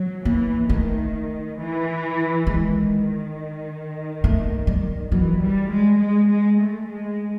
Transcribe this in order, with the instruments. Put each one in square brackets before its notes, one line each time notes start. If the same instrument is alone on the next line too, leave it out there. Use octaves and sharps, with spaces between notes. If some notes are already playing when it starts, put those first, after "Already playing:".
Already playing: [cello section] F#3
[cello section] E3 [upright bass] A#3
[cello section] D#3 [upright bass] A3
[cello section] E3
[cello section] D#3 [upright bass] G#3
[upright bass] A3
G3
[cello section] E3 [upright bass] F#3
[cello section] G3
G#3
G#3
G#3
A3
G#3